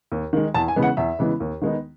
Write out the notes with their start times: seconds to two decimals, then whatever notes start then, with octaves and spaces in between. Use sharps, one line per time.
0.12 D#2
0.33 D#3 G#3
0.54 E2 A5
0.68 G#5
0.76 C#3 E3 G#3 B3
0.83 F#5
0.97 E2 E5
1.19 C#3 E3 G#3 B3
1.40 D#2
1.61 D#3 G#3 B3 D#4